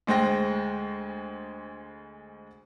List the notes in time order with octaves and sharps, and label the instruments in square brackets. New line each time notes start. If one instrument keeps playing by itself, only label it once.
[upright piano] D2 G#3 C5 G5 A#6